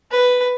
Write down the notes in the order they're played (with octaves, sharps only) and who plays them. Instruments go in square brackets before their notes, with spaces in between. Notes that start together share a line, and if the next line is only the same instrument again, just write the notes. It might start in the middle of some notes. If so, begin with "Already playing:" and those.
[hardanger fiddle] B4